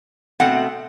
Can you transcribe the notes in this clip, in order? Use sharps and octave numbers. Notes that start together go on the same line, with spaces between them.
B2 A3 C4 F#5